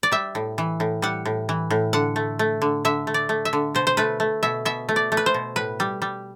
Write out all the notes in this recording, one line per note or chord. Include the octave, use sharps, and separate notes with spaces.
D5
G3 E5
A2
E3
A2
G3 F#5
A2
E3
A2
D3 F#5
A3
A3
D3
D3 E5
A3
D5
A3
E5
D3
B2 C5
C5
A3 B4
A3
B2 E5
B2 E5
A3
D5
A3
B4
C5
B2
A2 B4
G3
G3